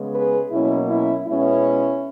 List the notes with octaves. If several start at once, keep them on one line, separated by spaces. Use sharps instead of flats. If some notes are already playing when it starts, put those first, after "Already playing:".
Already playing: C#3 G#3 B3
G#4 B4
B2 F#3 A#3 C#4 E4
C#4 E4
B2 G#3 B3 C#4 E4